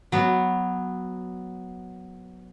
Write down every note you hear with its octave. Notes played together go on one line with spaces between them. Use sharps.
F#3 B3